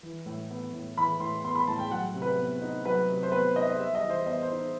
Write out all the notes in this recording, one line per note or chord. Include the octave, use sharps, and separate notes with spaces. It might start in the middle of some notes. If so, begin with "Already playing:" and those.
E3
A2
B3
A2
E3 B5
A2 C6
B3 C6
B5
A2 A5
G5
F#3 F#5
C3
B4
B3
D#4
F#3 B4
C3
C5
B3 B4
D#4 D#5
D#5
G3 E5
D#5
E3
C5
B3 D#5
C5
D#4